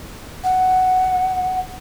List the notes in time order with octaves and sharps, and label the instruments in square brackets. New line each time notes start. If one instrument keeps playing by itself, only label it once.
[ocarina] F#5